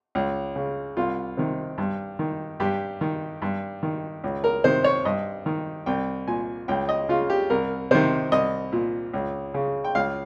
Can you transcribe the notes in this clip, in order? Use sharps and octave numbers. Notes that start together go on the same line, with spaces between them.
C#2
C#3
C2 F4
C3 D#3
G2
D#3
G2 G4
D#3
G2
D#3
C#2
A#4
C3 D#3 C5
C#5
G2 D#5
D#3
C2 G5
A#2 G#5
C#2 G5
D#5
C#3 F4
G4
C2 A#4
C3 D#3 C5
C2 D#5
A#2
C#2
C#3
G5
C#2 F5